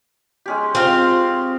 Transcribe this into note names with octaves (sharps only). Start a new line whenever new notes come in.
G#3 C#4 G4
C4 F4 F5